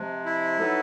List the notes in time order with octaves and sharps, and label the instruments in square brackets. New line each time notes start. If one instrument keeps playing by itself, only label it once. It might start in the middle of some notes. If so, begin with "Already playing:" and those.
Already playing: [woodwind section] C3 F3 G#3
[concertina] E4
[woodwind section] F#3 B3 D#4 F#4 A4